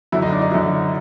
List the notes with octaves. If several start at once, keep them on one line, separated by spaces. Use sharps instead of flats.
F#2 D3 F#3 E4
D#4
D4
D#4
F#2 D3 F#3 E4